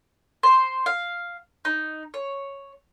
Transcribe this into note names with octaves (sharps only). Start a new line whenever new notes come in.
C5
F5
D#4
C#5